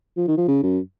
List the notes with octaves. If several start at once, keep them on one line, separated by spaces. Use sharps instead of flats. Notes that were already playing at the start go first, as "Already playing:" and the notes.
F3
D#3
F3
C#3
F#2